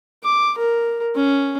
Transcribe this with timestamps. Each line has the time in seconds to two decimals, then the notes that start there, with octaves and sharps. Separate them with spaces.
0.24 D6
0.58 A#4
1.16 C#4